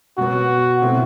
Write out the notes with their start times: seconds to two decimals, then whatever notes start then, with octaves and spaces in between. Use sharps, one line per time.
0.18 B2 F#3 B3 F#4
0.82 B2 A3 C4 E4